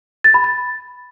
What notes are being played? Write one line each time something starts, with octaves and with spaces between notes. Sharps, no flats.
A6
B5
A6